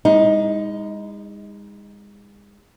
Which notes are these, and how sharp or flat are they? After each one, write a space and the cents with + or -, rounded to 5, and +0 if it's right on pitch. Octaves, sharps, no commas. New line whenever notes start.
G#3 -35 D#4 +15